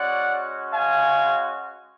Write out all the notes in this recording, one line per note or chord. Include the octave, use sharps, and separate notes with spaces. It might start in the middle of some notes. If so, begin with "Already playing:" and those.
Already playing: G#3 C#4 F#4 D5 F#5
F5 G#5